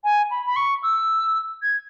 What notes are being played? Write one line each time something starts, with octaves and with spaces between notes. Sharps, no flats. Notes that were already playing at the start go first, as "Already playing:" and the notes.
G#5
B5
B5
C#6
E6
G#6